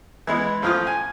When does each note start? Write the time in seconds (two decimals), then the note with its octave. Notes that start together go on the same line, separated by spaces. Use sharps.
0.27 E3 G#3 B3
0.62 A1 F3 F4 D#6 F6
0.87 G#5